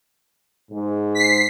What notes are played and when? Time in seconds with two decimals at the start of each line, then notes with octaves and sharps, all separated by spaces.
0.71 G#2
1.15 B6 C7